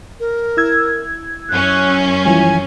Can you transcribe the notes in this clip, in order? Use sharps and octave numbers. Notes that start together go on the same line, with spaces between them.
A#4
E4 E6 G#6
F#2 C#4 F#6
E3 F3 G3 G#5